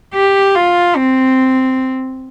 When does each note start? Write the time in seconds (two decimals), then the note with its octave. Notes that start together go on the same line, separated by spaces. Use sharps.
0.14 G4
0.55 F4
0.97 C4